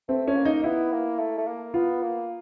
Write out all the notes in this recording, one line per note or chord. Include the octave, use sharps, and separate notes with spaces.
A3 C4
C#4
A#3
D#4
B3 E4
A#3
A3
A3
A#3
B3 F4
A#3